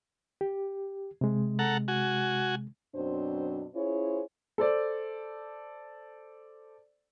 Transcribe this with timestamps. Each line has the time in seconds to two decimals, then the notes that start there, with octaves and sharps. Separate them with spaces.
0.41 G4
1.21 C3 G#3
1.59 A4 F#5 A#5
1.88 F#4 G#5
2.94 F#2 B2 F#3 C4 D4 C5
3.75 C#4 E4 F4 G#4 C5 C#5
4.58 A4 C5 D5